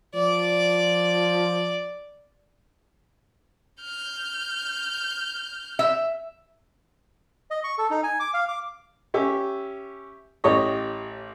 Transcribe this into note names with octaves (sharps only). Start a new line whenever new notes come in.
F3 D5
F6 G6
E5
D#5
C#6
A4
D#4
G#5
D6
F5
D6
C#4 G4 E5
A1 G4 C#5 D#5